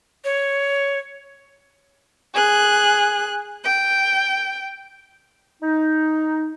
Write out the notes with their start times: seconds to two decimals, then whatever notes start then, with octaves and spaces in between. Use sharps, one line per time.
0.25 C#5
2.33 G#4 F#6
3.64 G5
5.63 D#4